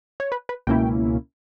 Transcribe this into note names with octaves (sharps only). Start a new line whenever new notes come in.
C#5
B4
B4
C#2 B2 A#3 C#4 E4 G5